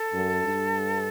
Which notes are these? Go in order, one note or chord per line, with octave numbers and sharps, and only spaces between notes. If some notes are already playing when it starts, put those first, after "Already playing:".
Already playing: A4
F#2
G2